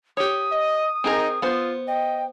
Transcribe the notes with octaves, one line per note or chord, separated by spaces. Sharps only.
G4 C#5 D#6
D#5
C4 D#4 G#4 A#4
B3 F4 C5
D#5 G5